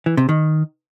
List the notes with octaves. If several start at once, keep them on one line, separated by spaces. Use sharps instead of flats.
E3
C3
D#3